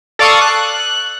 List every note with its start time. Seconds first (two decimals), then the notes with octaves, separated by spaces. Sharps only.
0.19 A4 D5 F5 C#6 D#6
0.41 F#6